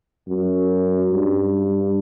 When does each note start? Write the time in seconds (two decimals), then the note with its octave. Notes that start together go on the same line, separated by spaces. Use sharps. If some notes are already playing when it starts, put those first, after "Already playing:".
0.28 F#2
1.13 G2